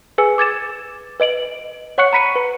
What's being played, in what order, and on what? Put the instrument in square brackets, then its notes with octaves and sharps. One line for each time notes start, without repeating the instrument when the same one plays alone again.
[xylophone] G#4 B4 G#5 E6 C#7
D6 G#6 A6 E7
B4 D#5 D7 F#7
C#5 F#5 C#6 F#6 C#7
A#5 B5 B6 C#7 D#7
B4